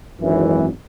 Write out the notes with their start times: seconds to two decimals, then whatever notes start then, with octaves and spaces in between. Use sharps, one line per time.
0.20 G#1 F#2 E3